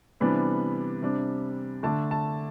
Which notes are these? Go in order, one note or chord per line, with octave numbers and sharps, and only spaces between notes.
C3 E3 G3 B3 D4 B5
C3 G3 D4
D3 A3 D4 A5
A5